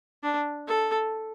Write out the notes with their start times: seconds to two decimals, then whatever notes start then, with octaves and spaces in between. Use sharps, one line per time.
0.23 D4
0.67 A4